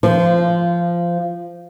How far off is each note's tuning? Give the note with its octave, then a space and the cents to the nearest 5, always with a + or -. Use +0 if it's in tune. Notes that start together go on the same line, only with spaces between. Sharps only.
F3 -15 F4 -30 C5 +0